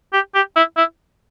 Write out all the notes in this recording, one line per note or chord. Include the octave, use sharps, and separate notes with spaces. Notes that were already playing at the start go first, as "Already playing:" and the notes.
G4
G4
E4
E4